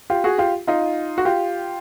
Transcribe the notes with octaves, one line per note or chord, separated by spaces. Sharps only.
F4 G4
F#4 G#4
F4 G4
D#4 F4
F#4
F4 G4